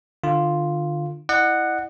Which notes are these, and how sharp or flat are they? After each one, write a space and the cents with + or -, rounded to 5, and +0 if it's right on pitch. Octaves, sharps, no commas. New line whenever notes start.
D3 +30 F4 +0
E4 +0 D#5 -45 F#5 +0